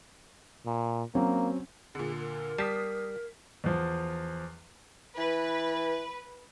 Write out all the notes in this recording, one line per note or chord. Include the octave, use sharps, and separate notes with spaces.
A#2
F#3 A#3 C4 C#4
A#2 D3 G#4
A#4
G3 A5 D#6 B6 C7
E2 F3
E3 B4